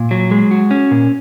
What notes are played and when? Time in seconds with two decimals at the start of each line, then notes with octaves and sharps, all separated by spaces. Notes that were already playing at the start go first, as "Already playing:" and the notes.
Already playing: A#2
0.11 F#3
0.31 G#3
0.51 F#4
0.71 C#4
0.91 A#2